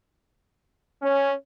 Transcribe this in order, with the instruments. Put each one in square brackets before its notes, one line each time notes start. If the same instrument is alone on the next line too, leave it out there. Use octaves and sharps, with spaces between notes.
[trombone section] C#4